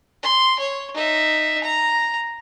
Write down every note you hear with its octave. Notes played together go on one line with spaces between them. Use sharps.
C6
C#5
D#4 E5
A#5